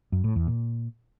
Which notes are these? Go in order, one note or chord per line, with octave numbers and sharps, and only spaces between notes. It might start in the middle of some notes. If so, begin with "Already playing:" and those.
F#2
A2
E2
A#2